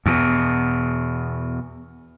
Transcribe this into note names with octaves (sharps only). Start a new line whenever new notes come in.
E2 B2